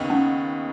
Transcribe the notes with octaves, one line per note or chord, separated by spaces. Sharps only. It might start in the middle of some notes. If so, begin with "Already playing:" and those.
Already playing: D#2 C#3 B3 D#4
C#4